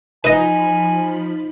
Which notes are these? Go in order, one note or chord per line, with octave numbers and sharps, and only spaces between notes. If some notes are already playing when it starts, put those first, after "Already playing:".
F3 D#4 B4 D#5 G#5 B5